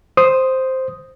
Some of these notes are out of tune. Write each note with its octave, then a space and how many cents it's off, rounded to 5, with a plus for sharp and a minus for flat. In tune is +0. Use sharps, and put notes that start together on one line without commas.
C5 +0 D#6 +0